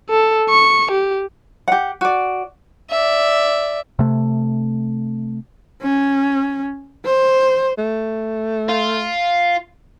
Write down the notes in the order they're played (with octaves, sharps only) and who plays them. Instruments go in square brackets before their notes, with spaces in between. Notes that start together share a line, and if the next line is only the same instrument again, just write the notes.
[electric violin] A4
C#6
G4
[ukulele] G4 F#5
F#4 D5
[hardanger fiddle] D5 E5
[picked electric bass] C3 A3
[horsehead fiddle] C#4
C5
[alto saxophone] A3
[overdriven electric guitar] F4